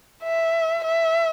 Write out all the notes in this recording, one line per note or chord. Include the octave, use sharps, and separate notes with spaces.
E5
E5